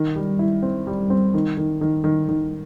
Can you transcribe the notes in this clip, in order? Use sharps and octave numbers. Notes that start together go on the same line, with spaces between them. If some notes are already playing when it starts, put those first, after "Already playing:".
Already playing: D#3
G3
E4
C4
G3
C4
D#3
D#3
D#3
D#3
D#3